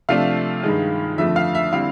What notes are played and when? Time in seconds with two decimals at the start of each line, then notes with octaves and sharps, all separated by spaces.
0.09 C3 F3 A3 D4 F4 F5
0.63 G2 D#3 G#3
1.18 F2 D3 F3 A3 E5
1.36 F5
1.55 E5
1.73 D3 G3 C4 E4 F5